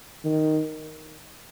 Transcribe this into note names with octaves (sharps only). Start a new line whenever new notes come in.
D#3